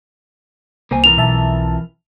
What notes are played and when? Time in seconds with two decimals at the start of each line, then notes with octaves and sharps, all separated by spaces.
0.91 C2 A#3 C5 G#5
1.04 F2 E3 A#4 F7
1.17 B1 E5 A5